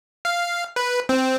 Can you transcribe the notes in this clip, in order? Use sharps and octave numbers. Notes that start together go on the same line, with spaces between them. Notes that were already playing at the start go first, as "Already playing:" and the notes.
F5
B4
C4